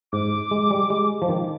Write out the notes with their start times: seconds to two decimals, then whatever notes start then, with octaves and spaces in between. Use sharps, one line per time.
0.12 G#2 D6
0.51 G#3
0.71 G3
0.90 G#3
1.22 F3
1.29 D#3